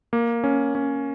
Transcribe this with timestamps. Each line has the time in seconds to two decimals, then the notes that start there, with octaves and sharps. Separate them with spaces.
0.13 A#3
0.44 C#4
0.75 C#4